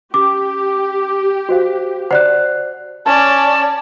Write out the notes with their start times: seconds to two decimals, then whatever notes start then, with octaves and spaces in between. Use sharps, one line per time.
0.14 C#4 G4 D6
1.49 F#4 C5 F5
2.11 C5 D5 F#5 F#6
3.06 C#4 D5 A5